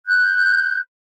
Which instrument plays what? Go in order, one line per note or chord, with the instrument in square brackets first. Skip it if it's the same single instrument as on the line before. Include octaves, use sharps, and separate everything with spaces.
[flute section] F#6 G6